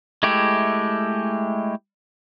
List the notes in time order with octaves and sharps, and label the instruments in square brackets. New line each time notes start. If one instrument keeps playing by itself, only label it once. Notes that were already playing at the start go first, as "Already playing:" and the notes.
[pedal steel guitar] G#3 A3 E4 G4